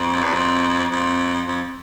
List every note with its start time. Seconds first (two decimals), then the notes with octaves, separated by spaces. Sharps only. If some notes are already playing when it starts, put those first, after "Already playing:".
Already playing: F2
0.23 E2
0.33 F2
0.91 F2
1.47 F2